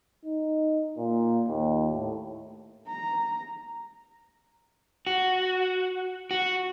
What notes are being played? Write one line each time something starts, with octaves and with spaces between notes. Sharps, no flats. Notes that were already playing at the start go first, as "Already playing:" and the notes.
D#4
A#2
D#2
A2
A#5
F#4
F#4